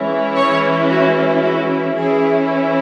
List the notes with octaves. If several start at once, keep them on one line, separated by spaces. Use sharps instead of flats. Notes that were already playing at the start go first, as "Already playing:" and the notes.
Already playing: E3 G#3 C#4 E4
C#5
F#4
F#4
E3 C#4 E4 G#4